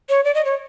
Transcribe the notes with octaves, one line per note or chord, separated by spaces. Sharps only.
C#5
D5
D#5
C#5